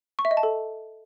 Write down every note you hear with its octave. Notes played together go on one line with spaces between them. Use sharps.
C#6
E5
D#5
A5
A4